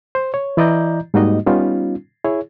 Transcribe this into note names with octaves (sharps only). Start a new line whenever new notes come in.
C5
C#5
E3 E4 D5 D#5 A#5 G6
G#2 G3 A#3 D#4 F#4 D#5
G3 B3 C#4 D#4 F4
E4 G#4 C#5